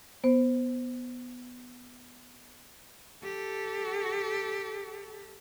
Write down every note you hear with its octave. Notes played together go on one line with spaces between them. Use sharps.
B3 C5
G4 A4